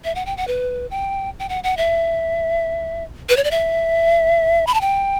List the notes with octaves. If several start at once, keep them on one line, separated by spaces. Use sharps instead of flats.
E5
F#5
G5
F#5
B4
G5
G5
F#5
F#5
E5
B4
C#5
D5
E5
B5
A5
G5